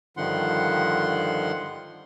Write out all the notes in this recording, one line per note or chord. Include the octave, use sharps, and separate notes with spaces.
G2 D3 D#3 F3 F#5 C6